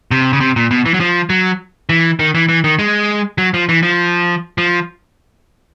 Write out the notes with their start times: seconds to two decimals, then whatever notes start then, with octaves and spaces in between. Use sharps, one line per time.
0.11 C3
0.33 C#3
0.40 C3
0.56 A#2
0.71 B2
0.86 E3
0.94 F#3
1.00 F3
1.30 F#3
1.89 E3
2.19 D#3
2.35 E3
2.49 E3
2.64 D#3
2.79 G#3
3.38 F#3
3.54 F3
3.69 E3
3.83 F3
4.58 F3